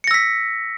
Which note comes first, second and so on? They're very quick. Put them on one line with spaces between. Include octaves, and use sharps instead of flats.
C#7 A#6 E6 B6